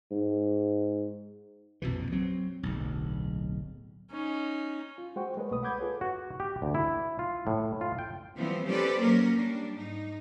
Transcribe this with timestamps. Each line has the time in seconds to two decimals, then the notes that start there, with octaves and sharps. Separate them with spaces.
0.11 G#2
1.82 A#1 F2 B2 E3
2.12 F#3 C4
2.63 D1 B1
4.11 C#4 D#4
4.98 F4
5.16 G#3 F#4 C5 F#5 G5 C#6
5.37 G#3 A#4 B4 C#5 D#5
5.51 C2 B2 A3 B4 D#6
5.63 F#5 B5 D6 G6 G#6
5.79 F4 G#4 A4 B4 C#5
6.01 F#4
6.40 G4
6.62 D2
6.75 E4
7.19 F4
7.47 A2
7.81 F4
7.99 G5
8.37 E3 F3 G3 B3 C4
8.66 C#4 G4 A4 B4 C5 D5
8.98 F#3 A#3 C#4 A#4
9.33 G3 D4
9.77 G#2 D#4